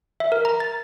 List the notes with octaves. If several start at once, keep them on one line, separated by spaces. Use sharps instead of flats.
E5
A#4
A#5
A6